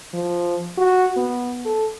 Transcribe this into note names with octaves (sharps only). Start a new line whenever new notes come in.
F3
F#4
B3
A4